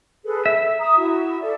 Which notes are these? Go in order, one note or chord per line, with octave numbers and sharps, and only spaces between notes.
G#4 A4 B4
A4 E5
A#5 D#6
E4 F#4
A4 D5 E5